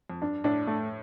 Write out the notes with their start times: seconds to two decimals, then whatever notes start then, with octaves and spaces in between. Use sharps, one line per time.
0.10 F2
0.21 G2 D4
0.44 A2 D4
0.67 A3